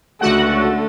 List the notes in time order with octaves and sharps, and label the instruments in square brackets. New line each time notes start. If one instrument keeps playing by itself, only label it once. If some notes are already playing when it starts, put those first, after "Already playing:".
[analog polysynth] C#2 F#4 F#5 [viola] D3 A3